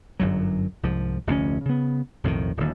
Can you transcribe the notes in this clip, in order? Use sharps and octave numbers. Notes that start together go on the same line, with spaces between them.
G1 F#2 F#3
C2 G#2 F3
F1 D2 C#3 C#4
C#3 B3
B1 F2 A2 D#3
D1 D#2